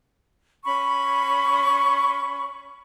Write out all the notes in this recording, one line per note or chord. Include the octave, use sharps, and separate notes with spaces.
C#4 B5 C#6